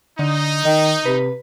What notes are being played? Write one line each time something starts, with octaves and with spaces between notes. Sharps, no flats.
D3 D#4
D#3 D#5
C3 B4